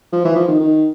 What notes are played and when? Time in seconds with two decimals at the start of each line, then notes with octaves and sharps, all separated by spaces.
0.13 F3
0.25 E3
0.36 F3
0.48 D#3
0.60 D#3